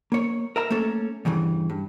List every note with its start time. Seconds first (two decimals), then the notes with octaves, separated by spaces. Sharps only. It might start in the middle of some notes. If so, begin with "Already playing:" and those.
0.12 A#3 C#5
0.56 A#4 E5 A#5
0.70 A3 A#3 C#4 A4
1.25 E2 G2 C#3 E3
1.70 G2